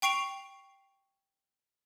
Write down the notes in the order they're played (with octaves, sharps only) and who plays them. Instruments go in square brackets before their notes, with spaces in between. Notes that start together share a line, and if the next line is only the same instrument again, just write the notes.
[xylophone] G5 C#6 C7 D7 F7